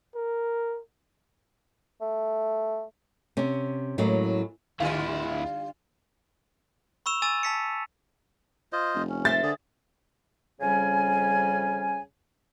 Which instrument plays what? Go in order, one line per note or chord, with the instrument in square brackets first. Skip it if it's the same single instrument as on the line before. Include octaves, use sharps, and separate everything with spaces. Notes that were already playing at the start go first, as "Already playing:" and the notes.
[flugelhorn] A#4
[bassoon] A3
[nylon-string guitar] C3 C#4
A2 F#3 G#3 A#3 C#4
[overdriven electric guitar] D2 E4 [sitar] D3 G3 F4 [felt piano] F5
[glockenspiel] B5 C#6 E6 E7 F7
G#5 D6 E6 A6 D#7
A5 B6 C#7
[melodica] F4 C5 D#5
[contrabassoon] F1
[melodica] C#4
[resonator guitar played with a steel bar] A#4 C5 E5 [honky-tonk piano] A6
[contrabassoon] D3 [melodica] G#4
[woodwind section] F2 C#3 G3 C#4 G#5